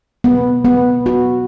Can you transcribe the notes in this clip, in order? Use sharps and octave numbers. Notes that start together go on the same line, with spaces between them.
B3
B3
F#4